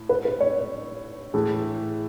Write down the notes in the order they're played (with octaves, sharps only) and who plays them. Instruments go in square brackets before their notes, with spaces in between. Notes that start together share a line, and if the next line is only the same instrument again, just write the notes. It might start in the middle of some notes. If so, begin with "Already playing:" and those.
Already playing: [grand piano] A2
[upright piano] B4
B4
C#5
[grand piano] A2 E3 A3 [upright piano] G#4